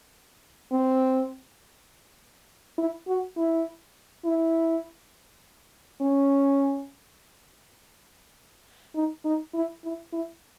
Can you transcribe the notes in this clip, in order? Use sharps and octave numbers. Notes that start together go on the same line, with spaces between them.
C4
E4
F#4
E4
E4
C#4
D#4
D#4
E4
E4
E4